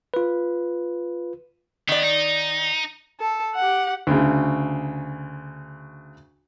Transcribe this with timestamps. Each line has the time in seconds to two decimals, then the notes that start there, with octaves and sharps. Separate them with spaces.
0.14 F4 B4
1.88 D#3 B3 D5
2.04 D#4
3.21 A4
3.55 G4 F#5
4.07 D2 C#3